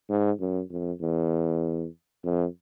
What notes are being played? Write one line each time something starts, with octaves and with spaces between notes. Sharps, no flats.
G#2
F#2
F2
E2
F2